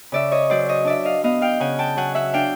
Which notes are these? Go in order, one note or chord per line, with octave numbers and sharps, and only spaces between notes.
C#3 D5 E5
C#5 D#5
F#3 C5 D5
C#5 D#5
D4 D5 E5
D#5 F5
B3 D#5 F5
F5 G5
C#3 F#5 G#5
G5 A5
F#3 F#5 G#5
E5 F#5
D4 F5 G5